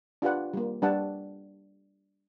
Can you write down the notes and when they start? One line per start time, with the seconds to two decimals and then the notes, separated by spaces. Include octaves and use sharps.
0.22 D4 F4 G4 B4 F#5
0.54 G3 A#3
0.82 G3 D4 B4 F#5 A5